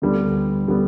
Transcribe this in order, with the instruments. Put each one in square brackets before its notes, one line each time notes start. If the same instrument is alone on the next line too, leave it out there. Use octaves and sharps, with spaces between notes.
[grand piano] D2 D3 G3 B3
D3 G3 B3